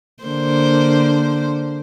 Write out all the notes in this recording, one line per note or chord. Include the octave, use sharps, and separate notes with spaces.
D3 A#3 C5